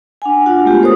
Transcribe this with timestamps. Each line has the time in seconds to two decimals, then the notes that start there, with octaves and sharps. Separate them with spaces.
0.22 D4 F#5 G#5
0.46 D4 F4 F#4 F#5
0.65 G#3 A3 B3 F4 G4
0.81 A4 A#4 C5 C#5 D#6